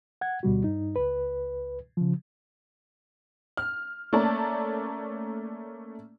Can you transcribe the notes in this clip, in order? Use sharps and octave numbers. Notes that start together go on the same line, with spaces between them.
F#5 G#6
D2 B2 G3 F#4
G2 D#4
C#2 B4
C#3 F3
F6
A3 A#3 C#4 D5 A5